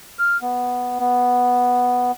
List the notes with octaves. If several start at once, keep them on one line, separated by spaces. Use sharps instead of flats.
F6
B3
B3